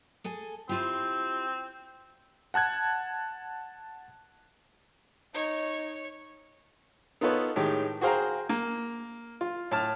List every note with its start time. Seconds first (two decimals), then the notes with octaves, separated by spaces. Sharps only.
0.24 G#4 A4 G#5
0.69 C4 E4 F4 G4
2.54 F#5 A5 F#6 G#6
5.34 D#4 C#5
7.21 B3 D#4 F4 A4 B4 C#5
7.56 A2 D#3 G#3 G4
8.01 F#4 G#4 C5 F5 G5 A#5
8.49 A#3
9.41 F4
9.71 A2 A5 F6